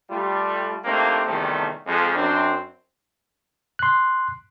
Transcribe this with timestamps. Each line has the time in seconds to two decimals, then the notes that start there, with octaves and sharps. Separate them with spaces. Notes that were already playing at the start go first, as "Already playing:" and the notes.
0.10 G3 A3 F4
0.85 A3 A#3 C4 D4 D#4 G4
1.26 E2 C3 D#3 F3 G3 A3
1.87 F2 G#3
2.15 F#2 C4 D4
3.79 C6 F#6